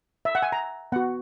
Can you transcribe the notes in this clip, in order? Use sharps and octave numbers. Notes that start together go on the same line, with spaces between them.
E5
F#5
G#5
A#5
B3 F#4 F#5